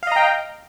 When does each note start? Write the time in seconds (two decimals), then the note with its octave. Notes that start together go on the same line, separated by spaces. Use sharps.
0.03 F5
0.07 D#5
0.12 A#5
0.16 G5